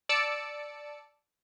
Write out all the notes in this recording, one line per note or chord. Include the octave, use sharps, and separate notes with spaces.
D5 A5 E6 C#7 D7